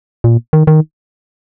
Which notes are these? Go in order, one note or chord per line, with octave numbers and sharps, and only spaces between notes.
A#2
D#3
D#3